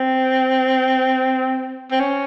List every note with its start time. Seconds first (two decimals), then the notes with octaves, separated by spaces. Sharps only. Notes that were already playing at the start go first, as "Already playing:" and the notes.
Already playing: C4
1.92 C4
2.00 C#4